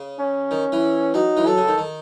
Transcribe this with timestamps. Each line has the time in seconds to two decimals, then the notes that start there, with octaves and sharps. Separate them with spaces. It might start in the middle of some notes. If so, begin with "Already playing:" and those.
Already playing: C#3
0.19 C#4
0.51 D#3
0.72 E3
1.14 F#3 D#4
1.37 E3
1.46 F#3 A4
1.57 C#3
1.68 D#3
1.78 D#3